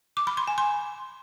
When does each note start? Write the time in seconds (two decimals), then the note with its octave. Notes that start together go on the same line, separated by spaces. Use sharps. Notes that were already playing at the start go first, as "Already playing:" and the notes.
0.17 D6
0.27 B5
0.37 C6
0.48 G#5
0.58 C6